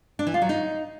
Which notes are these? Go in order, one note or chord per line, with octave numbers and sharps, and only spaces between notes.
D4
E3
F4
F#3
D#4